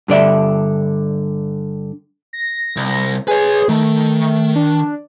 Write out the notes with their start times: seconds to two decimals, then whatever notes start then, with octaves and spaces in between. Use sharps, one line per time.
0.08 G2 D3 D5 E5
2.33 A#6
2.77 C2
3.28 G#4 B4 C#5
3.69 D#3 A3
4.56 D4